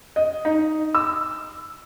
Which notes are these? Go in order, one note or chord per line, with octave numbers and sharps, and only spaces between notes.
D#5
D#4
E6